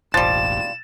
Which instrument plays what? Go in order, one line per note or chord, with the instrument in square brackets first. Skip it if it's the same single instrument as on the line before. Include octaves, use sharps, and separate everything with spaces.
[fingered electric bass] E1 A1 [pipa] F3 G3 [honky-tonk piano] A6 [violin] E7